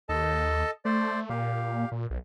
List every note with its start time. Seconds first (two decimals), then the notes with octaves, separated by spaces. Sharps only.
0.09 D#2 A4 D#5 A5
0.85 A3 C5 D5
1.30 A#2 G4 F5
1.92 A#2
2.10 B1